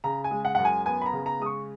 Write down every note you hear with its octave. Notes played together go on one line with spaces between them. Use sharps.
C#3 A#5
G#5
G#3
F#5
F#2 F#5
G#5
B3 G#5
B5
A#5
C#3
A#5
G#3 D#6
C#6